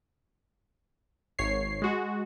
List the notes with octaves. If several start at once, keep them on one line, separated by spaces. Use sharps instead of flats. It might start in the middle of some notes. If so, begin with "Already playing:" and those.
G#1 C#5 C7
G#3 F#4